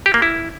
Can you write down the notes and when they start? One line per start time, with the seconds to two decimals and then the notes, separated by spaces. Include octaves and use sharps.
0.06 G4
0.14 A#3
0.22 E4